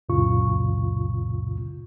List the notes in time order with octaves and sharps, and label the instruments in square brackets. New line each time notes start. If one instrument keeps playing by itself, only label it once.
[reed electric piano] C#2 F#2 A#2 C#3 F4 C#6